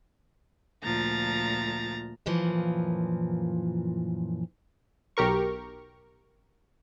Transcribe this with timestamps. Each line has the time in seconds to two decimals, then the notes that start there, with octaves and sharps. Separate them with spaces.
0.83 D2 A#2 F3 A#5 A6
2.26 F#2 A#2 E3 F3
5.17 B1 G4 A#4 C#6